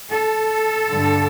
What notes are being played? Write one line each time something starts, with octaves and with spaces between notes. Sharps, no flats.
A4
G2 D3